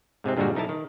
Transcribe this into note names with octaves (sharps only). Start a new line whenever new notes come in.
G#2 C3 G#3 C4
G2 A#2 D3 G3 G#3 F#4
B1 D#4 E4 A#4 A5
D#3